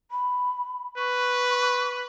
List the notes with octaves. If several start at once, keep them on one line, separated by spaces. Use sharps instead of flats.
B5
B4 C#6